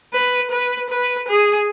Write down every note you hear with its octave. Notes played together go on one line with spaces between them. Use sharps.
B4
B4
B4
G#4